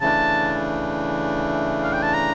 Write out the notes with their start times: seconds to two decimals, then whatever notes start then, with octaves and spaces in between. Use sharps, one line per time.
0.01 C#3 E3 A3 D4 A5
1.83 F5
1.93 G5
2.03 A5
2.14 A#5